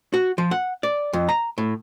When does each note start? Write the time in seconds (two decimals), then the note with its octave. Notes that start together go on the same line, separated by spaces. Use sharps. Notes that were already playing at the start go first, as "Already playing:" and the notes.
0.14 F#4
0.38 F3
0.51 F#5
0.83 D5
1.13 F2
1.29 A#5
1.58 A2